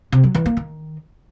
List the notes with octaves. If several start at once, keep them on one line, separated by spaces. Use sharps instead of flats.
C3
F#3
E3
A#3
D#3